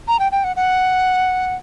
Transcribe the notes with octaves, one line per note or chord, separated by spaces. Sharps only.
A#5
G5
G5
F#5
F#5